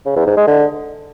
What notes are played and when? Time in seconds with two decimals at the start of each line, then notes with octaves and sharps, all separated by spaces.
0.06 C#3
0.16 E2
0.27 G#2
0.37 G#3
0.47 D3